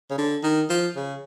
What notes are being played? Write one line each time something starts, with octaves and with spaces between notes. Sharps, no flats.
C#3
D3
D#3
F3
C#3